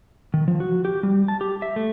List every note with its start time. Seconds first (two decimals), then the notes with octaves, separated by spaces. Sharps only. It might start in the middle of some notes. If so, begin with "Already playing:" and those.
0.34 D#3
0.48 F3
0.60 F#4
0.85 G4
1.03 G3
1.28 A5
1.41 G4
1.62 E5
1.76 A3